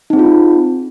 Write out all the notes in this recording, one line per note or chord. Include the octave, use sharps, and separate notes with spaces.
C4 D#4 F4 G#4